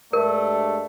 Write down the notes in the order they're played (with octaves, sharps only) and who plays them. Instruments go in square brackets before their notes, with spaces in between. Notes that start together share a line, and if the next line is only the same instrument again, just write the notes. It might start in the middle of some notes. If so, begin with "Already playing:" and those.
[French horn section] G2 G#3 D5 [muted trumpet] A3 [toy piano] A#4